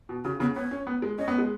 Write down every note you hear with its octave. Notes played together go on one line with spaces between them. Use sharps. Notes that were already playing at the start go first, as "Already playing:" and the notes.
B2
C#3 F#4
C#3 B3
B3 C#5
C#4
B3
G#3
C#4 D#5
B3
G#3